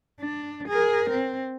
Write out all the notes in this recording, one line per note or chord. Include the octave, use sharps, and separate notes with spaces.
D4
G#4 A#4
C4